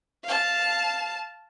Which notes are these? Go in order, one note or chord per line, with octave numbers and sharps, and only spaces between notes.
F5 A5